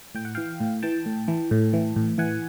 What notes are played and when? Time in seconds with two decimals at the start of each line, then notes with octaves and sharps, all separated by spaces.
0.15 A2 G5
0.25 F#5
0.35 E3 F5 G5
0.60 A2
0.82 E3 G5 A5
1.06 A2
1.28 E3
1.51 A2
1.73 E3
1.96 A2
2.18 E3 F#5 G#5